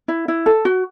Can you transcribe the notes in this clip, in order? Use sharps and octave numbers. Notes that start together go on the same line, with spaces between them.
E4
E4
A4
F#4